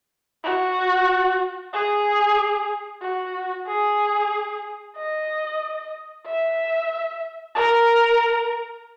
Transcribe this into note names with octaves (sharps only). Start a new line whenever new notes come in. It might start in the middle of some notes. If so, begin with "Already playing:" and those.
F#4
G#4
F#4
G#4
D#5
E5
A#4